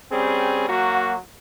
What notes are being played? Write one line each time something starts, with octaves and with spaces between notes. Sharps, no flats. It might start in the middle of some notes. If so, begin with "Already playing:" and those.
G3 C4 C#4 G#4
F#3 A#3 F#4